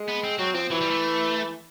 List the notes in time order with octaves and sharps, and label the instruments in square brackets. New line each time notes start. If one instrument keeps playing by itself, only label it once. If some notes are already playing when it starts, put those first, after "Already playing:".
Already playing: [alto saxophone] G#3
[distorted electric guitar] B3
C4
[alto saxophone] F#3 [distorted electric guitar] C4
[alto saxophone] F3 [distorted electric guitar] C4
[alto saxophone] E3 [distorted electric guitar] F#3
[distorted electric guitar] G3
A3